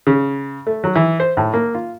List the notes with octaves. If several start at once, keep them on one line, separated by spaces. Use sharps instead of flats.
C#3
A3
F#3
E3
C5
A2
A#3
F4